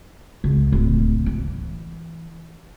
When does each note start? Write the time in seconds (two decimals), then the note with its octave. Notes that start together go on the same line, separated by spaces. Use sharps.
0.44 C#2
0.72 D1
1.26 E3